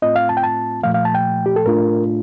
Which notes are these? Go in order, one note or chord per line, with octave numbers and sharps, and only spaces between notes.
A2 A3 C4 F4 D#5
F5
A5
G5
A5
A#2 F3 A3 F5
F5
A5
G5
G4
A4
A2 A3 D4 F4 A#4